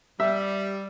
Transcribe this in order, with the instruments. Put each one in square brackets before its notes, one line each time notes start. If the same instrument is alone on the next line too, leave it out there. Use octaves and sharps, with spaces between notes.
[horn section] G3 [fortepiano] E5